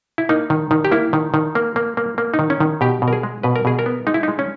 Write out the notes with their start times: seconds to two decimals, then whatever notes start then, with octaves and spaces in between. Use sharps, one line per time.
0.18 E4
0.29 A#3 D#4
0.50 D#3
0.71 D#3
0.85 G4
0.92 A#3 E4
1.13 D#3
1.34 D#3
1.55 A#3
1.76 A#3
1.97 A#3
2.18 A#3
2.34 D#4
2.39 D#3
2.50 C#4
2.60 D#3
2.81 B2 G4
3.02 B2
3.08 A#4
3.13 G#4
3.23 G#3
3.43 B2 B4
3.56 A#4
3.65 B2 G#4
3.79 A#4
3.86 B3
4.07 G#3 D#4
4.14 E4
4.23 G#3 D#4
4.39 C#4